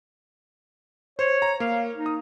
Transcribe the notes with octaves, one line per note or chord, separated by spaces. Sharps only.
C5 C#5
A#5
A#3 F5
D#4
D#6